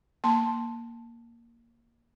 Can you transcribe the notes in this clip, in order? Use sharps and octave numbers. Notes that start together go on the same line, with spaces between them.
A#3 A5 C6